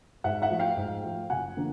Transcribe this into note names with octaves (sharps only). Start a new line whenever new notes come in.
G#2 E5 F#5
E5 F#5
F3 A3
F5 G5
G#2
F3 A3
F#1 F#5 G#5
D3 F3 A#3